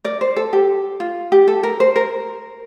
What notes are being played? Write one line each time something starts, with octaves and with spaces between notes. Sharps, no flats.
A#4 D5
C5
A4
G4
F4
G4
A4
A#4
C5
A#4